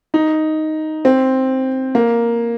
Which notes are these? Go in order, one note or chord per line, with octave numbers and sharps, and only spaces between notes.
D#4
C4
A#3